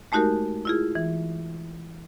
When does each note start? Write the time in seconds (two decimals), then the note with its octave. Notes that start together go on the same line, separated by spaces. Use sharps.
0.12 G#3 A3 D#4 F#4 G4 A#4
0.65 E4 F4 G#4
0.95 E3